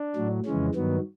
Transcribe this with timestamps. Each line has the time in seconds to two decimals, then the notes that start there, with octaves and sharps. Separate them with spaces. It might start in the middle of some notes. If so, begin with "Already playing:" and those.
Already playing: D4
0.16 A2 F#3
0.45 F2 C#3 E3 G#3 C#4
0.75 G2 D#3 F#3 B3